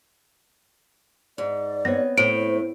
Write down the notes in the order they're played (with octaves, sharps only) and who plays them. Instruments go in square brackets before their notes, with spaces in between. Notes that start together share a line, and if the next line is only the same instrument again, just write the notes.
[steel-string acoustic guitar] G#2 [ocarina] D5
[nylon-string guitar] B3 C4 C#5 [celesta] A#6
[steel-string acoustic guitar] A2 [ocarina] C5 [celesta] D7